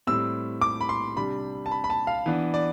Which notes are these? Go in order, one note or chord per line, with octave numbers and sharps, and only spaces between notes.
A2 G3 C4 E6
D6
B5
C6
C3 G3 D4 B5
A5
B5
B5
A5
F5
E3 B3 D4
D5